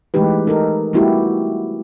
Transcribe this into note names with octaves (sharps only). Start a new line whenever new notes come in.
E3 G#3 A3 D#4 G4 B4
D#4 A4 A#4
G3 A3 B3 E4 F#4 G4